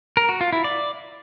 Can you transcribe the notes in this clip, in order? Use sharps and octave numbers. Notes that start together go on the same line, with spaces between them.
A#4
F#4
F4
E4
D5